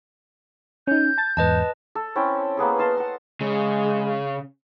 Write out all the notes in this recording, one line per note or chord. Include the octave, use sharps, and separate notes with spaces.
C#4 D#4 G6
A5 A6
E2 G#2 B4 D#5 A5
A4
C4 C#4 E4 G5
A#3 B3 G#4 A4
D#5 F5 A5 C6
F#5 A5
C#3 G#3